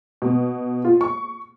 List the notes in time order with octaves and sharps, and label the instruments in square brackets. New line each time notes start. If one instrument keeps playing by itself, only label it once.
[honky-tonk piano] B2
F4
C#6